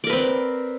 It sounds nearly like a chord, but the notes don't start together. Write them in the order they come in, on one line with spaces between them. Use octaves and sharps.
D5 A#4 B4 C4